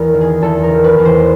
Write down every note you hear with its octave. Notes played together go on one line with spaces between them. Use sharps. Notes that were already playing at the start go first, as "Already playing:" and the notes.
Already playing: E2 A#4
D#3
G#4
E2 A4
A#4
D#3
B4
E2
C5